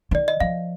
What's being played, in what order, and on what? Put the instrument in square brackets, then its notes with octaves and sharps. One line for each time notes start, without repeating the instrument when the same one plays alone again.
[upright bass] D#3 [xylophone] D5
[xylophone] D#5
[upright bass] F3 [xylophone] F5